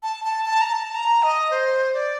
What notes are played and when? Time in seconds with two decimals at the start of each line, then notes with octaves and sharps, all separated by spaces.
0.03 A5
0.25 A5
0.45 A5
0.61 A#5
0.67 A5
0.95 A#5
1.23 D#5
1.51 C5
1.94 D5